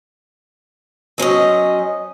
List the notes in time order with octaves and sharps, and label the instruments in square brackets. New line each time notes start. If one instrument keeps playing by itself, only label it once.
[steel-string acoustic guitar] F#3 C#4 C5 D#5